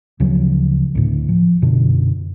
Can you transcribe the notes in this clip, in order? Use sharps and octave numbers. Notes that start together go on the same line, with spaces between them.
D2 C#3 F3 F#3
D2 A2
F3
F#2 B2 D3